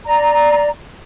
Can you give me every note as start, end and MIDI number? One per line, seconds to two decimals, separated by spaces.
0.06 0.69 74
0.06 0.69 82